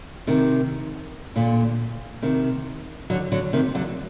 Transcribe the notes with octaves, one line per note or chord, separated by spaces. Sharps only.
C3 D#3
A#2 D3
C3 D#3
D3 F#3
D3 F#3
C3 D#3
D3 F#3